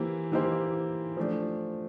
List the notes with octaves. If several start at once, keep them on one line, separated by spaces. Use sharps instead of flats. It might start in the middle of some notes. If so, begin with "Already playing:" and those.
Already playing: E3 A#3 E4 G4 C5
E3 A#3 E4 G4 C5
F3 A3 D4